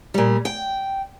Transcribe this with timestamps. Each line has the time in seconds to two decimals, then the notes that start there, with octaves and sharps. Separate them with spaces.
0.14 A#2 G3
0.45 G5